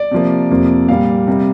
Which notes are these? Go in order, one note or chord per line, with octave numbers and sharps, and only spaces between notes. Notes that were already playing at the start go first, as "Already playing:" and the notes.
Already playing: D5
C3 F3 A#3
F2 C3 F3 A#3
A#2 G3 A#3 F5
C3 G3 A#3